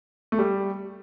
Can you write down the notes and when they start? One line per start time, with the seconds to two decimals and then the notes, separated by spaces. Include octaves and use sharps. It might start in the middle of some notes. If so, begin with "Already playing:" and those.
0.32 A3
0.39 G3